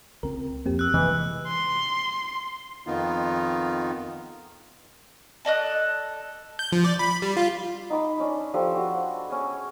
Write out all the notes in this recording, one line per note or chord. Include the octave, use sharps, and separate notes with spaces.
C#2 C4 A#4
F2 A#3 C4 G4
E6 F#6
F#2 C3 E3 G#3 D#5
C6
F2 D#3 B3 D#4 F4
A4 D5 D#5 F#6
G6
F3
D5
B5
G3
F4
D#4 B5 D6
C#4 D4 D5
F3 D4 G4 A4
F#4
C#4 G#4